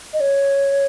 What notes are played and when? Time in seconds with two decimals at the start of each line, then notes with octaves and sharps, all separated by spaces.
0.13 D#5
0.20 C#5